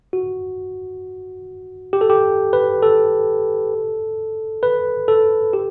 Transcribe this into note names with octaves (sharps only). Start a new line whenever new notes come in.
F#4
G4
A4
G4
B4
A4
B4
A4
G4